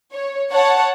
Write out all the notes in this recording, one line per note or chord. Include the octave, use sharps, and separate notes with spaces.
C#5
C#5 F#5 A5